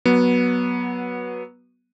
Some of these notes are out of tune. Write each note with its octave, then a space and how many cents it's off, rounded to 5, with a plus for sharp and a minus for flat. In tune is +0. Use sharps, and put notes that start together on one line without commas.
F#3 +0 B3 -15